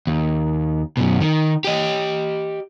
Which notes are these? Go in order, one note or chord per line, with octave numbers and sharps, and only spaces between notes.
D#2
F#2 B2
D#3
G4 D#5